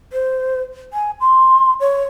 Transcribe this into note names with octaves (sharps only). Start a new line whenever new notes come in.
C5
G#5
C6
C#5